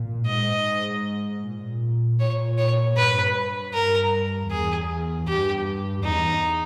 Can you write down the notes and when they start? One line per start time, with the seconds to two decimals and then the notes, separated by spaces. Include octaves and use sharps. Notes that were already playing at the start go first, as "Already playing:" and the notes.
Already playing: A#2
0.26 G#2 D#5
1.42 A#2
2.19 A#2 C#5
2.58 C#5
2.96 G2 B4
3.73 G2 A#4
4.50 E2 G#4
5.27 G2 G4
6.04 E2 D#4